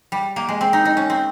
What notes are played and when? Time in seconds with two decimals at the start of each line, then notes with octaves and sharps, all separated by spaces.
0.12 G3
0.36 A#3
0.49 G#3
0.61 C4
0.73 D#4
0.85 D#4
0.97 C#4
1.10 C4